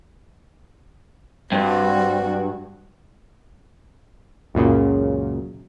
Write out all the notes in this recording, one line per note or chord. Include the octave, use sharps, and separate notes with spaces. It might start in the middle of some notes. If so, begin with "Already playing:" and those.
G2 G3 C4 F#4
C#2 F#2 A#2 C#3